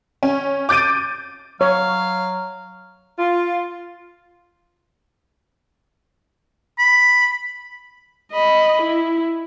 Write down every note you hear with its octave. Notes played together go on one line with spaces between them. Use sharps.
C#4
D6 G6 A6 D7 D#7
F#3 C#5 F5
F4
B5
D#5 B5
E4